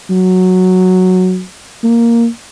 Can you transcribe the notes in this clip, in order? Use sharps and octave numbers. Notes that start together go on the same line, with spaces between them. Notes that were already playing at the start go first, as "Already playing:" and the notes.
F#3
A#3